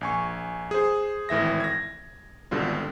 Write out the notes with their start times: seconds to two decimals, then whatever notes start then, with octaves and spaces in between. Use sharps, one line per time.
0.01 A#1 G#5 C#6
0.71 G#4 C5
1.29 G#1 A2 E3 E5 A#6
1.60 G#6 A#6
2.51 G#1 B2 D3 G3 F4